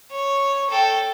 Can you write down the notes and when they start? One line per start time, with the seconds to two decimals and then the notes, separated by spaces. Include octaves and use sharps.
0.11 C#5
0.70 A4 G5